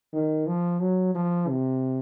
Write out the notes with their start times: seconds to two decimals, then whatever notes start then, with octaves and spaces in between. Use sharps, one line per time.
0.14 D#3
0.47 F3
0.81 F#3
1.15 F3
1.49 C3